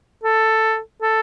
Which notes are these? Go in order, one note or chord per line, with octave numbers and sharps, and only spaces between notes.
A4
A4